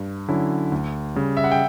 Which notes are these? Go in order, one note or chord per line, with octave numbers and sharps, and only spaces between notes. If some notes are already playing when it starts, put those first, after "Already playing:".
Already playing: G2
D3 F#3 C#4 E4
D2
C#3 G3
E5
F#5
G5